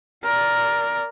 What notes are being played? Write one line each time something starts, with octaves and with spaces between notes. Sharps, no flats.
A#4 D5